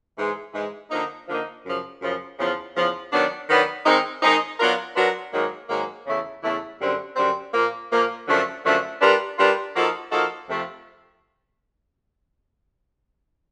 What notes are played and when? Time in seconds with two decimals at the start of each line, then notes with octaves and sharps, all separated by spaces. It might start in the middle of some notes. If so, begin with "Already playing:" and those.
0.17 G#2 E3 G#3
0.53 G#2 E3 G#3
0.91 D3 F3 A#3 D#4
1.27 D3 F3 A#3 D#4
1.65 F#2 C#3 F3
2.01 F#2 C#3 F3
2.38 E2 C#3 F3
2.74 E2 C#3 F3
3.12 D#3 F#3 B3 D4
3.48 D#3 F#3 B3 D4
3.85 D#3 G#3 C4 D#4
4.22 D#3 G#3 C4 D#4
4.59 F#3 B3 D4 F4 A#4
4.95 F#3 B3 D4 F4 A#4
5.33 G#2 D#3 F#3 A#3
5.69 G#2 D#3 F#3 A#3
6.06 E2 C#3 E3 A3
6.43 E2 C#3 E3 A3
6.80 F#2 D3 G3 C4
7.16 F#2 D3 G3 C4
7.53 A#2 F3 A#3
7.91 A#2 F3 A#3
8.28 F#2 D3 F3 A3
8.64 F#2 D3 F3 A3
9.01 G3 B3 D4 F4 A#4
9.38 G3 B3 D4 F4 A#4
9.74 F3 A#3 D#4 F#4 A4
10.11 F3 A#3 D#4 F#4 A4
10.48 F2 C3 F3 A3